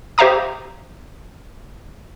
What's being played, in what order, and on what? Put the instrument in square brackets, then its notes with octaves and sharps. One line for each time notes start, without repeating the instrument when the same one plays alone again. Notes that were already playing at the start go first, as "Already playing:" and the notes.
[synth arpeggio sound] G4 C5 E5 F5 A#5 D#6